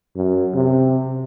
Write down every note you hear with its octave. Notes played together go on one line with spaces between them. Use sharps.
F#2
C3